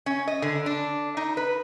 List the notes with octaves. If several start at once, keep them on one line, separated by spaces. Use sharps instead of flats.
C#4
D#5
D3
D4
D#4
B4